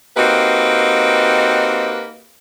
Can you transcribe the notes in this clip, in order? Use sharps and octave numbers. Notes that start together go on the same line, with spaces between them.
A#3 C4 D#4 F#4 G4 B4